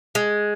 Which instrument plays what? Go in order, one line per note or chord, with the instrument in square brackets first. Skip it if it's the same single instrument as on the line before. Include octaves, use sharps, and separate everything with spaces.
[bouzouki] G#3